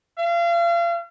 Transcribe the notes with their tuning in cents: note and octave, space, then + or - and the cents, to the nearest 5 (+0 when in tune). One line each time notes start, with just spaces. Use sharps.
F5 -35